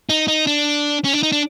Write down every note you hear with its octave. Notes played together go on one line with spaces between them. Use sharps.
D#4
D#4
D4
C#4
D4
D#4
D4